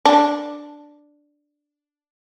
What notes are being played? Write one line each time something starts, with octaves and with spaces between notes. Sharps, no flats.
D4